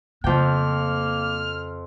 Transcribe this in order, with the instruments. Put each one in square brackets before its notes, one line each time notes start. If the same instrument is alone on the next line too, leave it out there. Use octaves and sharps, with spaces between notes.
[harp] F2 G5 [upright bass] C#3 [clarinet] A#3 [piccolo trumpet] F6